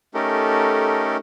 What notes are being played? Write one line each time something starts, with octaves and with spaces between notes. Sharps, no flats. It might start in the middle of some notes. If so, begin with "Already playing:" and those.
A3 C#4 D#4 G4 A4 A#4